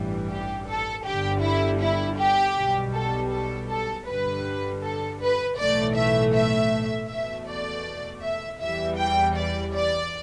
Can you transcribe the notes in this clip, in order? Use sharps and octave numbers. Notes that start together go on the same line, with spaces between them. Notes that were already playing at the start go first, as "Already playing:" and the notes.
Already playing: A1 G2 E3 G3
G4
A4
G1 G2 D3 G3 G4
E4
E4
G4
B1 B2 G3
A4
A4
A4
G2 D3 G3 B4
A4
B4
B1 A2 E3 A3 D5
E5
E5
E2 B2 A3 E5
D5
E5
E2 E3 G3 E5
G5
D5
D5